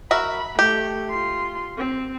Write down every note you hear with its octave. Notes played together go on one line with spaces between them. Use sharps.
F#4 A#4 E5 B5
A3 G4
F4 C6
C4